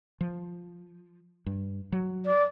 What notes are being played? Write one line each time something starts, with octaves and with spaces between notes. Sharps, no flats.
F3
G2
F#3
D5